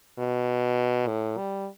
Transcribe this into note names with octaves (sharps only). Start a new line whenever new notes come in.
B2
A2
G3